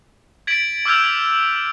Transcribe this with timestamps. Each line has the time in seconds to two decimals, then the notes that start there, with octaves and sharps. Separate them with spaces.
0.47 G#6 A6 B6 D7 F#7
0.86 D6 E6 F6 G6 G#6 F7